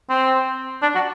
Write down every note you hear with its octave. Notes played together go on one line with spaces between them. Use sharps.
C4
D4
F#4